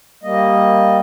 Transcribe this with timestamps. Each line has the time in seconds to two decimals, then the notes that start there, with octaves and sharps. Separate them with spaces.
0.23 G3 A#3 D#5